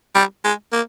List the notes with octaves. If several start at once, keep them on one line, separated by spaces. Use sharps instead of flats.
G3
G#3
A#3